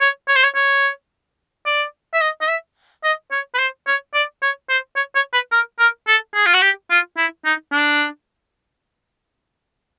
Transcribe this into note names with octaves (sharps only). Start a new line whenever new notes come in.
C#5
C#5
C5
C#5
C#5
D5
E5
D#5
D#5
E5
D#5
C#5
B4
C5
C#5
D5
C#5
C5
C#5
C#5
B4
A#4
A#4
A4
G#4
F4
F#4
G4
F4
E4
D#4
D4